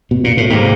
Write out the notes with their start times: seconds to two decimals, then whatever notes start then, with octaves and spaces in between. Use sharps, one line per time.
0.11 B2
0.24 A#2
0.37 A2
0.50 G#2 C3 D#3 G3 A#3